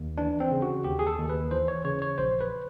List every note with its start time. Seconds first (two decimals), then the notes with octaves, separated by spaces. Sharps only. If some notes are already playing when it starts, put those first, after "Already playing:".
Already playing: D#2
0.18 E3 D4
0.40 C4
0.51 C#3
0.62 F#4
0.84 D#2 G4
0.99 G#4
1.07 A4
1.18 D#2
1.30 B4
1.51 E3 C5
1.68 C#5
1.84 C#3 C#5
2.02 C#5
2.18 A#1 C5
2.41 B4